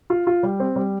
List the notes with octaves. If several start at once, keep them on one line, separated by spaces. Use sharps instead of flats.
F4
F4
G3
C4
G3